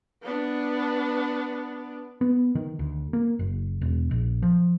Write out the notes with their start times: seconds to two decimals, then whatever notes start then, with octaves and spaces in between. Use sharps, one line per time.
0.23 B3 D4
2.21 B3
2.55 D#3
2.79 D2
3.13 A#3
3.39 F#1
3.81 E1
4.11 A#1
4.42 F3